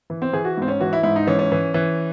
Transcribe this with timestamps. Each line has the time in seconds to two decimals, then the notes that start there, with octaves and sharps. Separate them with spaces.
0.10 E3
0.22 C4
0.33 E3 G#4
0.45 F#4
0.57 G#2 C4
0.68 C#4
0.80 E3 F#4
0.93 E4
1.03 G#2 E4
1.16 D#4
1.27 E3 C#4
1.39 C#4
1.52 E3
1.74 E3